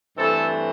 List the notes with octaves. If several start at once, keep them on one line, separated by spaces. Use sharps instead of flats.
G2 E3 A3 C4 A4